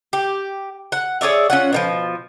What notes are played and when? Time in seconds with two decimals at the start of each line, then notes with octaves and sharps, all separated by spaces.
0.13 G4
0.92 F#5
1.21 G#4 C#5 D5 E5
1.50 C#4 F4 F#5
1.73 B2 D#3 F3